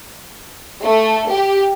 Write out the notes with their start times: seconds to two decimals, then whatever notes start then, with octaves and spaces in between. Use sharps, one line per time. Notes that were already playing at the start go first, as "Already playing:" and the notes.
0.85 A3
1.31 G4